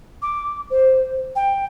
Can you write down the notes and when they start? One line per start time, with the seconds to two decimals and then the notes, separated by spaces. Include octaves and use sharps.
0.22 D6
0.70 C5
1.35 G5